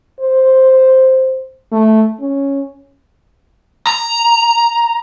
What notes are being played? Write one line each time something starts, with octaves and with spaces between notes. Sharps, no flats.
C5
A3
C#4
A#5